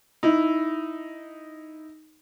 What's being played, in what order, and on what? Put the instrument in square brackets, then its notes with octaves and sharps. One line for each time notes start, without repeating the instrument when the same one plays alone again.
[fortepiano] D#4 E4